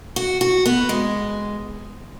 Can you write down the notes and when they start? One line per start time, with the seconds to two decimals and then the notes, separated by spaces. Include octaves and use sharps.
0.16 F#4
0.41 F#4
0.66 B3
0.89 G#3